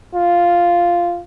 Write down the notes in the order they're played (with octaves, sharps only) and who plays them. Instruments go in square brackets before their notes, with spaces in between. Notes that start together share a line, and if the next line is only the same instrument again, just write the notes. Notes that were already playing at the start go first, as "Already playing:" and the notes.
[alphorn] F4